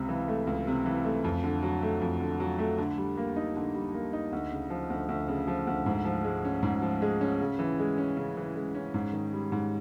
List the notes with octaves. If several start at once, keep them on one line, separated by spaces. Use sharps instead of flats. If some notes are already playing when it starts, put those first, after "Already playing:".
Already playing: C#2 C3
E3
A3
C#2
C3
E3
A3
F2
D3
F#3
A3
F2
D3
F#3
A3
D3
G3
A#3
D#4
D3
G3
A#3
D#4
D2
C#3
F3
D2
D2
C#3
F3
D2
G#2
F3
G#3
C#4
G#2
F3
G#3
C#4
C#3
E3
G#3
C#4
C#3
E3
G#3
C#4
G#2
D#3
G3
G#2